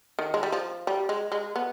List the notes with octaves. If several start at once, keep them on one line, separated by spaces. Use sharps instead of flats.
D#3
G#3
G3
F3
G3
G#3
G#3
B3